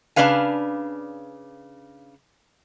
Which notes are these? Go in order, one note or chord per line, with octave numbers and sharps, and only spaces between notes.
C#3 B3 D4 B4 F5 G#5